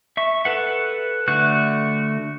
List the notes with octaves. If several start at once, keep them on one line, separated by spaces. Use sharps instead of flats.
E5 C#6
A4 B4 F#5
D3 A3 F#4 F#6